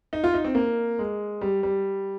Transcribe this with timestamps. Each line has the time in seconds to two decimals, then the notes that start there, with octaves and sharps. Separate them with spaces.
0.13 D#4
0.24 F4
0.34 D#4
0.45 C4
0.55 A#3
0.99 G#3
1.41 G3
1.63 G3